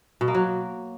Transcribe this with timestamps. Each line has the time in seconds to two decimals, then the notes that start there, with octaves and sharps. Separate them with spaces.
0.21 B2
0.28 A#3
0.35 F#3